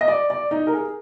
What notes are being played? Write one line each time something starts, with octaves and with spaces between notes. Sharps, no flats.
D#5
D5
D5
D#4
A#4
G#4